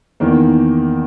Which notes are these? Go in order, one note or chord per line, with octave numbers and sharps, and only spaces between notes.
E2 D#3 A#3